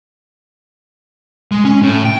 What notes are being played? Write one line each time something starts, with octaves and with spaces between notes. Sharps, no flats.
G#3
C#4
A2
G5